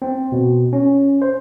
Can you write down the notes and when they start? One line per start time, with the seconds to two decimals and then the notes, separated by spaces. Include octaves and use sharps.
0.02 C4
0.32 B2
0.73 C#4
1.22 C5